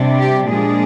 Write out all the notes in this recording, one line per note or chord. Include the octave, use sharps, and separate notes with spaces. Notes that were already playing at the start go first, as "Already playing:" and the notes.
Already playing: C3 G3 D4
G4
A#2 F3 G#3 D4 G#4